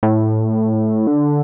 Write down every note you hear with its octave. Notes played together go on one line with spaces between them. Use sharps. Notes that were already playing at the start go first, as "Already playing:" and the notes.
A2
D3